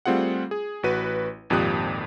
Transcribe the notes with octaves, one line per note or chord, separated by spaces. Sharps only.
G3 A3 C4 F4 G#4 F#5
G#4
A1 F#4 B4 D#7
G#1 F2 A#2 G4 D#6 F#6